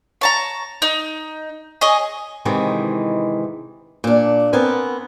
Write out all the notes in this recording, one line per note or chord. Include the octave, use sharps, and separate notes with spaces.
C#5 A5 A#5
D#4
G#4 C#5 D#5
G#2 C3 D#3 E3 G#3
A#2 D4
B3 C4 A#4 G#5